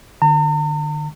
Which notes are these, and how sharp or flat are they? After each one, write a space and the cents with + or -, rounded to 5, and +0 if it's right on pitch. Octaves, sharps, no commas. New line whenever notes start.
D3 +40 A#5 -45